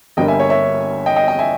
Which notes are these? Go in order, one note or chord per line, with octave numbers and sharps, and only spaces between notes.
G1 G2 G3 A#3 D#5 G5
E5 G#5
C#5 E5
C#5 E5
D#5 G5
D#5 G5
D#5 G5
E5 G#5